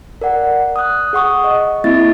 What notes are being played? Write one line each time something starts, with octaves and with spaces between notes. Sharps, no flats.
A#4 D5 F#5
D#6 F#6
G#4 F#5 C#6 D#6
D#5
A#3 C4 E4 E5 A6